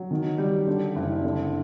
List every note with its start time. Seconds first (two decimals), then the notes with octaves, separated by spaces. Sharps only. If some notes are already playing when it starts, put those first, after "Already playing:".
Already playing: F#3
0.11 D#3
0.38 G3
0.67 D3
0.95 F#1
1.24 D3